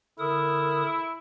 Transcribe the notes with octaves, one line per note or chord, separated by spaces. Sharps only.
D3 E4 A#4 D#6